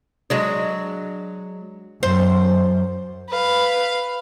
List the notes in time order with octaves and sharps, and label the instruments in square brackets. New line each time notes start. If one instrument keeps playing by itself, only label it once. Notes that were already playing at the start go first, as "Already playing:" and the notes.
[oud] F#3 G#3 D4
[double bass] F#2 [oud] C5
[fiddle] B4 F5